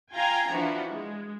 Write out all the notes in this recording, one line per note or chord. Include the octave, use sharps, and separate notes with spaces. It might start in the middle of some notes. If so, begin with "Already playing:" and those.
F4 F5 G5 G#5 A#5
E3 F3 D4 F#4
G#3